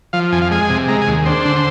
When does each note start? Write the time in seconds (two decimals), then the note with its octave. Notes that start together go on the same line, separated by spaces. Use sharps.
0.13 F3 F5
0.32 F2 G#5
0.41 F5
0.51 G#3 G#5
0.70 C3
0.88 G#3 A#5
1.02 G#5
1.07 D#2
1.26 D4 C5
1.45 D3